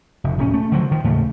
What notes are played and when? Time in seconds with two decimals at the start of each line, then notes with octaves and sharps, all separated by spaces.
0.24 F1
0.39 D1 C#4
0.54 A3
0.72 D3 F3 F#3
0.91 D#3 F3
1.04 D#2 A2 C#3 A3